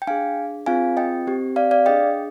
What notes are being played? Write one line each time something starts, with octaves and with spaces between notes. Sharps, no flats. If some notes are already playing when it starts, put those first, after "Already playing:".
G5
D4 G#4 F5 G#5
C4 F4 G#4 F5 G#5
D#5 G5
C4 G4
D5 F5
D5 F5
D4 G#4 D#5 G5